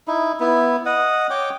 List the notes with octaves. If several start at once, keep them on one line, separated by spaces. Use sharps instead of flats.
D#4 E4
B3 E4
D#5 F#5
C#5 G5 D6